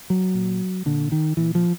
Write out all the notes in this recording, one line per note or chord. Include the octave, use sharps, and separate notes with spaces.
F#3
A#2
A#2 D3
D#3
A#2 E3
F3